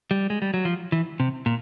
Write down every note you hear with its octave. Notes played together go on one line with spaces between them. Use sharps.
G3
G#3
G3
F#3
F3
E3
C3
A#2